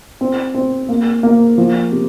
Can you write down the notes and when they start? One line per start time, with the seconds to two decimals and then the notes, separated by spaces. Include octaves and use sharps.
0.21 C4
0.54 C4
0.89 A#3
1.23 A#3
1.58 F3
1.92 C3